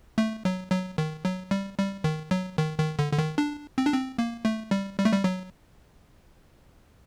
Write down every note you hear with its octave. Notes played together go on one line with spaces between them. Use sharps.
A3
F#3
F#3
D#3
F#3
G3
G3
D#3
F#3
D#3
D#3
D3
D3
D#3
D4
C4
D4
C4
A#3
A3
G3
G3
A3
G3
F#3